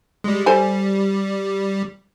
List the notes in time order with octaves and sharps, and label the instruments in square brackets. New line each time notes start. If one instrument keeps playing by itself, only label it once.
[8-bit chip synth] G3 G#3
[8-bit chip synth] G3 [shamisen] A4 C5 G#5